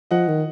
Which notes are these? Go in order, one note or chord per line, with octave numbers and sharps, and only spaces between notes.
F3 D#5 F#5
D#3